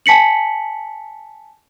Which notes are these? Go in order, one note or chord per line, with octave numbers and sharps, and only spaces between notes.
G#5 A5 B6 C#7 F#7